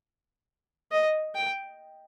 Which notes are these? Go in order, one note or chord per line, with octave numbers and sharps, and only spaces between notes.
D#5
G5